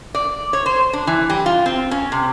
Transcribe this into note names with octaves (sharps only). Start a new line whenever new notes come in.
D5
C#5
C5
D4
E3
G3
F4
C4
C#4
C3